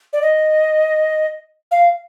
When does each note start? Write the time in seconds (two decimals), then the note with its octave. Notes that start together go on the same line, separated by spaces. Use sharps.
0.13 D5
0.22 D#5
1.71 F5